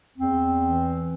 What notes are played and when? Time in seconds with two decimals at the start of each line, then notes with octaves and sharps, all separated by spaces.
0.17 E2 C4
0.61 E3